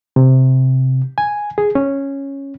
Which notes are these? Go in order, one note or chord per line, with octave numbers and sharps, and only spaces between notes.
C3
G#5
G#4
C#4